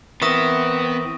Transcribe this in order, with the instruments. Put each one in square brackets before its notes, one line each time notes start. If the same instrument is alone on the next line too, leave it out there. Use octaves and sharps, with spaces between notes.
[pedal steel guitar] E3 A#4 E5 [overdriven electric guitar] B3 [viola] C4 [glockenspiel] C#6 D#6 A#6